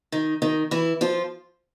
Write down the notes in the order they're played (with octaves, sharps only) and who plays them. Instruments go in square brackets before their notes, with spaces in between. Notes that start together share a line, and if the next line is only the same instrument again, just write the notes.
[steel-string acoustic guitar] D#3 D#4
D#3 D#4
E3 E4
F3 F4